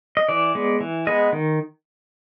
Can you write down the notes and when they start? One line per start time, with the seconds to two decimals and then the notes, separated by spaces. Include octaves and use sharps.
0.17 D#5
0.29 E3 D5
0.55 G#3 B3
0.81 E3
1.07 G#3 B3 D#5
1.33 D#3